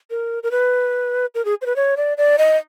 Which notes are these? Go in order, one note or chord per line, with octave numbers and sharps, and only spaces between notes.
A#4
A#4
B4
A#4
G#4
C5
B4
C#5
D5
D5
D#5